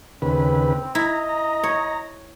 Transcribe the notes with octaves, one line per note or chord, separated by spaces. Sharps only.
D#2 C#3 C4 B4
E4 D#5 A#5
A#5
C#5